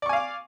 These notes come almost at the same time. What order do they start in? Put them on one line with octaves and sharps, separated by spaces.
D5 C#6 G#5 F5 D6